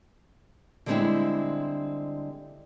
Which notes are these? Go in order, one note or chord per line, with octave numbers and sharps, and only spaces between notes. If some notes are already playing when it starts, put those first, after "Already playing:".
D3 G3 G#3 C4 D4 E4